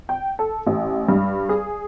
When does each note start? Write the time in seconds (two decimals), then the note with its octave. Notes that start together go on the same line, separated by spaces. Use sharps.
0.09 G5
0.39 A4
0.66 A1
1.09 G2
1.49 G#4